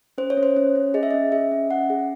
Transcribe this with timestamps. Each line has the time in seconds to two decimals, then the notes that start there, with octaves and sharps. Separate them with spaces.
0.18 C#4 C5
0.30 C#5
0.37 C#4
0.43 C5
0.57 C#4 C#5
0.75 C#4
0.94 G#4 D#5
1.03 E5
1.11 C#4 D#5
1.32 G#4 E5
1.52 C#4
1.71 C#4 F#5
1.90 G#4